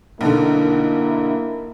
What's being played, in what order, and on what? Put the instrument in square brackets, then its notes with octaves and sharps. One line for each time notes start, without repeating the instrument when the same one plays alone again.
[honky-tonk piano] B1 D3 [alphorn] A#3 [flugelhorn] E4